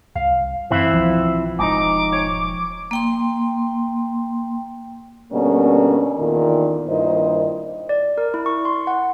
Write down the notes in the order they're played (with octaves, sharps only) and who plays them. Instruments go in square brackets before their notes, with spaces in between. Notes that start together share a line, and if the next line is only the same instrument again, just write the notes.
[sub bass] C2 [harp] F5
[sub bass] F#2 [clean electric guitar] E3 C4 E4
[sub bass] B1 [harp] F3
[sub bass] E1 [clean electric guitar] G#2 D#4 [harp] G5 D#6 A#6 [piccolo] D6
[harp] C#5
[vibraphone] A#3 G5 C6
[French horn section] B2 D3 G3 A#3 C#4
E2 A#2 D3 D#3
G2 A#2 D#3 E4 C5 D#5
[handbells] D5
A#4
E4
C#6
C6
F#5